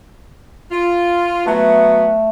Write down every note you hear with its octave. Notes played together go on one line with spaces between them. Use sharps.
F4
F#3 A3 B3